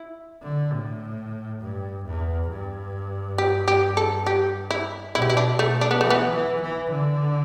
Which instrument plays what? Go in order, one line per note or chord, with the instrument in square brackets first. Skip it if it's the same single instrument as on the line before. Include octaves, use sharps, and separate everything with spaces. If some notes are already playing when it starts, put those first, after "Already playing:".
Already playing: [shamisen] E4
[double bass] D3
A2
G2
E2
G2
[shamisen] G4
G4
A4
G4
E4
[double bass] B2 [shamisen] E4
[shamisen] G4
E4
D4
A3
D4
B3
[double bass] E3 [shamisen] A3
[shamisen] B3
[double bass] E3
E3
D3